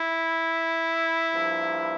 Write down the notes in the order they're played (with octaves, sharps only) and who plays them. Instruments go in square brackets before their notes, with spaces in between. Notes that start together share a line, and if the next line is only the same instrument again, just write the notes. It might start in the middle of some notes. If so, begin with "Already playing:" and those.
Already playing: [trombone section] E4
G2 F3 A#3